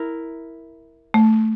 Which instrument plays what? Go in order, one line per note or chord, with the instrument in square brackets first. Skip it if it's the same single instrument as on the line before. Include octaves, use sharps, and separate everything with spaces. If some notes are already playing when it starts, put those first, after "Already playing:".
Already playing: [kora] E4 A#4
[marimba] A3